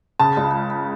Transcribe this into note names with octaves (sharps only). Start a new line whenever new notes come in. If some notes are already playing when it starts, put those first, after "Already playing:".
C#3 A5
C#2